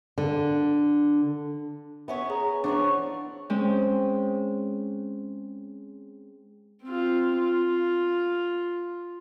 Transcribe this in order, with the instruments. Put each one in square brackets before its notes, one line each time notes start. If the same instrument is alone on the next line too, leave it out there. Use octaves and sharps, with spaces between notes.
[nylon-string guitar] D3
[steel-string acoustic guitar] B3 C#4 C#5 [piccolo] E5
[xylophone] G#4 [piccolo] A#5
[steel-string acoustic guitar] E3 F3 B3 [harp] D4 [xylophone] C5 C#5 [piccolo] C#6
[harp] G#3 C4 C#4
[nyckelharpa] C4 F4
F4